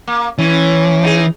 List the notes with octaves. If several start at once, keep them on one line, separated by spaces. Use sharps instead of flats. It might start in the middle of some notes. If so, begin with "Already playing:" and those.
A#3
E3 C#4
D#4 F4 G#4